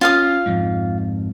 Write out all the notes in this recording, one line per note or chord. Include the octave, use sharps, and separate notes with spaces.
C#4 F4 F5 D#6
F2 G#2